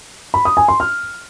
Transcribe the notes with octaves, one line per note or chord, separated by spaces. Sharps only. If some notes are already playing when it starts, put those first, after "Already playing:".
B5
D#6
G#5
C6
F6